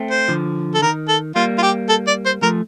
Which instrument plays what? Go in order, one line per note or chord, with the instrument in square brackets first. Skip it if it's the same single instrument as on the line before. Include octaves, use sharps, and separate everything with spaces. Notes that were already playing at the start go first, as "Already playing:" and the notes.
Already playing: [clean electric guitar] A3 C4
[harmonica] C5
[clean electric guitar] D3 F3
[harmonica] A4
[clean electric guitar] D#3 [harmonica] A#4
[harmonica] A4
[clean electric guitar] G3 A#3 [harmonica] F4
[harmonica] F4
G4
A4
D5
C5
[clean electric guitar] F3 A3 [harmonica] A#4